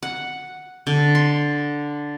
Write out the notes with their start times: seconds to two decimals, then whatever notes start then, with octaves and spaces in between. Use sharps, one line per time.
0.03 F#5
0.87 D3
1.15 C6